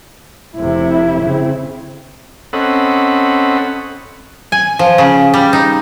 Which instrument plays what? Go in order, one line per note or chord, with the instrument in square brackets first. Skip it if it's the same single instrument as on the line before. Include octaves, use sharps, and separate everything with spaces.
[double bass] F1 C3 [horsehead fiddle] E4
[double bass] C#3 C4
[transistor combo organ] C4 C#4 A4 D#5 F#5 B5
[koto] G#5
F3
C#3
G3
D#4